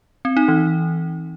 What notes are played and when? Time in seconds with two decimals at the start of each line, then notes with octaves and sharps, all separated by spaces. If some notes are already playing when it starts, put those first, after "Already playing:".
0.25 C4
0.37 D#4
0.48 E3